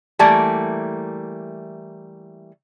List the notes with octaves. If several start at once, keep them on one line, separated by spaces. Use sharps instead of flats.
E3 G3 A3 A#3